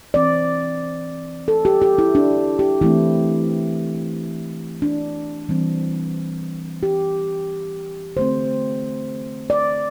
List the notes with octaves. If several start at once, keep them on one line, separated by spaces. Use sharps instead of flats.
E3 C4 D5
A4
G4
G4
E4
D4
G4
E3 A3 C4 E4
D4
E3 G3 C4
G4
D3 A3 C4 C5
D5